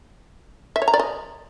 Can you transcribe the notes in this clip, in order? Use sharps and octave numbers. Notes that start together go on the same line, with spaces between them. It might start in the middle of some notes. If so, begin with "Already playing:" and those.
E5
C#5
A#5
D5
D#5